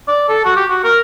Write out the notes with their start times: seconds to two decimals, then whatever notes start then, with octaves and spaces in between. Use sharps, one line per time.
0.08 D5
0.29 A4
0.45 F#4
0.57 G4
0.70 F#4
0.84 A#4